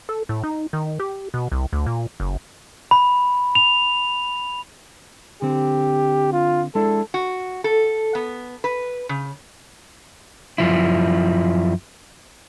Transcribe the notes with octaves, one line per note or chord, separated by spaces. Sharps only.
A4
A2
D#4
D#3
G4
B2
C2
D2
A#2
F#1
B5
F7
D3 C4 G4
F4
G#3 D4 E4 A4
F#4
A4
B3
B4
C#3
F#2 F3 E4